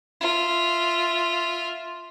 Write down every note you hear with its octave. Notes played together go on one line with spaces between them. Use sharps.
F4 E5